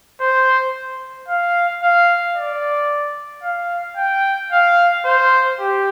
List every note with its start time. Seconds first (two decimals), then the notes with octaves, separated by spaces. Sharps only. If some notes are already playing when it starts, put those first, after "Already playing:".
0.21 C5
1.28 F5
1.82 F5
2.36 D5
3.43 F5
3.97 G5
4.52 F5
5.05 C5
5.60 G4